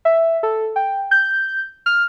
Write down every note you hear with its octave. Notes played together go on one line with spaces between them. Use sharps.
E5
A4
G5
G6
F6